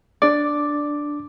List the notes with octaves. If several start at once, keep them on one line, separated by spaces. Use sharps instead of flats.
D4 D5 D6